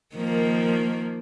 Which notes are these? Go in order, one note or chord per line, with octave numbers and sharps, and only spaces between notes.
D#3 F3 A#3